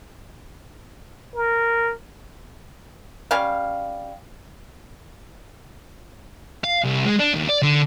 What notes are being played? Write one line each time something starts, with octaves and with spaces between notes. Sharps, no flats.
A#4
G3 C#4 F5
F5
C2
G#3
D4
D#2
D5
D3